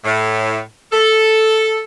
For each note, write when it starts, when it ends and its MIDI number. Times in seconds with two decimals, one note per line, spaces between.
0.05 0.61 45
0.92 1.80 69